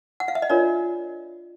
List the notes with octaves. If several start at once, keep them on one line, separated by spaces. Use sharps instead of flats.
F#5
F5
E5
D#5
D4 F4 A#4 C#5 D5